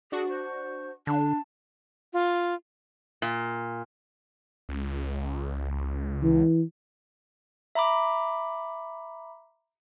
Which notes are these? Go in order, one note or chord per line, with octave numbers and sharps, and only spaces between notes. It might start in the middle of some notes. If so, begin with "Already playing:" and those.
D4 F#4 G#4
C5 C#6
D3 D4 A5
F4
A#2
C#2
E3
E5 A#5 B5 D6